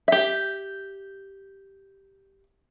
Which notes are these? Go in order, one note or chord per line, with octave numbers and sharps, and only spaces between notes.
G4 E5